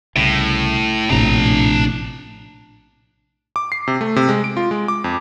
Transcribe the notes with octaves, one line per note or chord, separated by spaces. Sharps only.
C2 A2 C#3
A#1 A2 C3 D4 A#5
D6
C7
C3
A3
C3
G#3
D7
F4
G#3
D6
F2